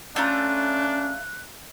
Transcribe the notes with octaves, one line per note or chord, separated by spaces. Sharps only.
A3 C#4 D4 F4 A#5 F#6